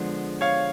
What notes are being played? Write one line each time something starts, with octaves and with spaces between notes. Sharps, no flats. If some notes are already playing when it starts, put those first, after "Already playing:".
Already playing: D3 F3 G#3 B3
C#5 F5